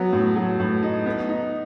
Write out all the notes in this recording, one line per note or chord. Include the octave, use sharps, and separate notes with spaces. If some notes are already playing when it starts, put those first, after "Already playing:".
Already playing: F#3 B3
A2
F#3
A2
D#4
B3
D#4